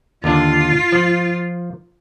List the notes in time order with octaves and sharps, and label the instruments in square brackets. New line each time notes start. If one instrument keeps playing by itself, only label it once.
[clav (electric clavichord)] D#2 D3 D4 [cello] F4
[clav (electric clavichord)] F3